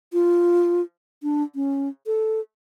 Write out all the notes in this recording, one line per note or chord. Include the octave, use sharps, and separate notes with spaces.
F4
D4
C#4
A4